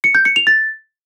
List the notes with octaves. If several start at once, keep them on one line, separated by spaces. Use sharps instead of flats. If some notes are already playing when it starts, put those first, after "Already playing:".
C#7
G6
C#7
F7
A6